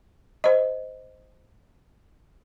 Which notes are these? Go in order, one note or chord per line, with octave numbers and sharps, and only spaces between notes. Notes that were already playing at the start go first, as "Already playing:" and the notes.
C5 D#5